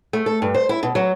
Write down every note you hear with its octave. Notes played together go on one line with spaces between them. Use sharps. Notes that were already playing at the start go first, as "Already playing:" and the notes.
A3
A4
G2
C5
E4
B2
F#3